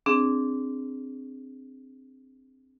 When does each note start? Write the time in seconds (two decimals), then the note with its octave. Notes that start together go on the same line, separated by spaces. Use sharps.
0.06 C4 D4 G#4